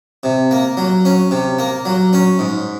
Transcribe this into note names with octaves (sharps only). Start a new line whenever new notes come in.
C3
A#3
F#3
C#4
C3
A#3
F#3
C#4
G#2